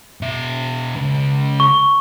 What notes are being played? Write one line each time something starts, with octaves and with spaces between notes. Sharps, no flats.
B2 E5
C#3 G#3
C#6